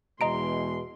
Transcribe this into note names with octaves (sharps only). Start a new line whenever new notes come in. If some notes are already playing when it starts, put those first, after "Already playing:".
E2 B2 G#3 D#5 A#5 C6 D7